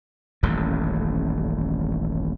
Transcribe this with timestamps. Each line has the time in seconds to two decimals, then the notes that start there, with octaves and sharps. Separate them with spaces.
0.43 D#1 A1 F#2